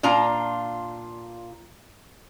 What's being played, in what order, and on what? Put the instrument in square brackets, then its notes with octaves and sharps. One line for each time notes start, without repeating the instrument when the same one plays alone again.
[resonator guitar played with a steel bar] A#2 D4 F4 A#5